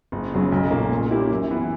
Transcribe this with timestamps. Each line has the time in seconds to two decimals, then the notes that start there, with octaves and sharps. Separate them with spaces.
0.12 F#1
0.32 E2 C#3 F#3 C#4
0.52 B1
0.71 A#2 A#3 C#4
0.91 A#2
1.11 A#3 C#4 E4 G4
1.31 F#2
1.51 E3 B3